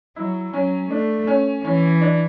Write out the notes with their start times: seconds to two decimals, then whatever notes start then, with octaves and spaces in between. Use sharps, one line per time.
0.16 F#3 E4
0.53 F#3 C#4
0.90 A3 D4
1.27 C#4
1.64 E3 C#4
2.01 D4